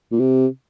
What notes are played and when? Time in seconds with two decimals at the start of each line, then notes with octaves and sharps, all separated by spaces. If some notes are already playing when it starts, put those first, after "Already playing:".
0.12 A#2
0.19 C3